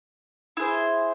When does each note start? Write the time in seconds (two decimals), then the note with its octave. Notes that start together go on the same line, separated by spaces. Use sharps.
0.57 E4 G#4 C5